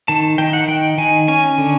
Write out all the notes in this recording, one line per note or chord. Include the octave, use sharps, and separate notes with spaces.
D#3 A5
D#3 G5
F#5
D#3 G5
D#3 G#5
C#4 G#5
D3